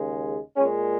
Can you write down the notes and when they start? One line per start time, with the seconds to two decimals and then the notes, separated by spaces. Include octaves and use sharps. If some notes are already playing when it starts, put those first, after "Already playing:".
Already playing: D#2 C#3 G#3
0.55 A#2 G#3 C#4